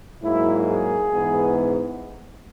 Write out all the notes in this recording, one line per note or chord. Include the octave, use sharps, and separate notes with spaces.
G#2 F#3 A#3 E4
G#4
G#2 E3 B3